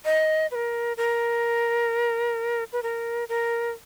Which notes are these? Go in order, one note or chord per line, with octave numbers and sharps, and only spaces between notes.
D#5
B4
A#4
A#4
B4
A#4
A#4